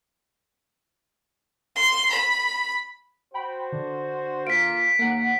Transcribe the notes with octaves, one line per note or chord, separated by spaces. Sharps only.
C6
B5
F#4 C5 G5 B5
D3
A#3 F4 A#4 B6 D7
D#2 A#3 F#5